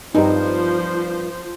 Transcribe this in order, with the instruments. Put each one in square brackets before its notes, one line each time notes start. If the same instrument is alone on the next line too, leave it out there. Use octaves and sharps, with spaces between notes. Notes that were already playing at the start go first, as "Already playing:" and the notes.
[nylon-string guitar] G2 C4 [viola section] F3 C5 [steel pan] D#4 G4